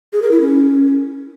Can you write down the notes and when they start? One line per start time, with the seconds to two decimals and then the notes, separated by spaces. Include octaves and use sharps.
0.13 G#4
0.22 A#4
0.31 E4
0.40 C#4